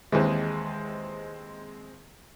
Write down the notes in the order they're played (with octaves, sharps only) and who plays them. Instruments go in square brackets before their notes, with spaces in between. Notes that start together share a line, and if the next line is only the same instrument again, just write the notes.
[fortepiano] D#2 E3 [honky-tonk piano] G#3 C4